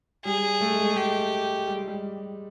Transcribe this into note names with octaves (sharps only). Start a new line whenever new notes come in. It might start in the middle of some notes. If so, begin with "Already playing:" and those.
G3 G#4
A3
G#3
A3
G#3 G4
G3
G#3
G3